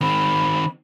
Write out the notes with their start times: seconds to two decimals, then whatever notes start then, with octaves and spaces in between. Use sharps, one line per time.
0.01 D#3 C4 B5